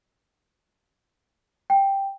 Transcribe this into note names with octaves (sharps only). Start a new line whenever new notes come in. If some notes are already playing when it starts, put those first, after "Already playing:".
G5